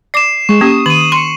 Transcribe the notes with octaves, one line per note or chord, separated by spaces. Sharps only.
D5 D6 C7 E7
G#3 C#6
A#3 C#4 G4 D#6
D#3 D#7 F#7
C6 C#7